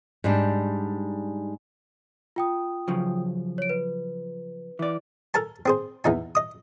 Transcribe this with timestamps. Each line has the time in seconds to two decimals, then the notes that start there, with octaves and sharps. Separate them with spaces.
0.24 G#2 G3 D4
2.36 F4 G5 D#6
2.88 C#3 F3 F#3
3.58 C#5 D7
3.69 B4
4.79 E3 D5
5.34 A4 A#4 G#5 A5
5.66 C4 G#4 C5
6.04 E2 E3 D#4 G#5
6.35 D#5 D#6